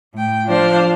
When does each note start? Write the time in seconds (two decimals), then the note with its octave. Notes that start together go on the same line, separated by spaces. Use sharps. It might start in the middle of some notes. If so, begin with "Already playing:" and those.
0.14 A2 G5
0.46 F3 D4 C5 F5